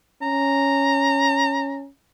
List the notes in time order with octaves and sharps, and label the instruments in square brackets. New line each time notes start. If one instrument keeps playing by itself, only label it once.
[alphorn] C#4 [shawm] A#5